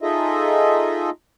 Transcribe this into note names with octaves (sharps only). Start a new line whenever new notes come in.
D#4 F4 G#4 A4 D#5 E5